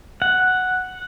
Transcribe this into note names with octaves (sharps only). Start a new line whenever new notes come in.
F#5